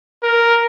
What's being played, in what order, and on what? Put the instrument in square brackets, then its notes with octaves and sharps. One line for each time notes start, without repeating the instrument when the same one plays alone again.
[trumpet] A#4